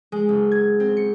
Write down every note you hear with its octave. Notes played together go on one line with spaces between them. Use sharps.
G#3
F#1
G#6
C4
C#7